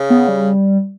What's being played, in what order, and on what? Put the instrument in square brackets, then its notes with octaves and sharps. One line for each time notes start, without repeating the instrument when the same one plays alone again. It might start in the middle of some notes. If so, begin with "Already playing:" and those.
Already playing: [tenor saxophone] C#3
[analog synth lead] B3
G3